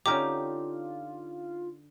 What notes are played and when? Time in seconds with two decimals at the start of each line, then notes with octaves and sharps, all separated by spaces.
0.06 D3 C#4 D#4 F4 G4 A#4 A#5 D6